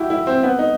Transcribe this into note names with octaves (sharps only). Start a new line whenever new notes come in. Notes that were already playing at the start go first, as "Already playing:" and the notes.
Already playing: E4 F#4 G4
E4
C4
B3
D#4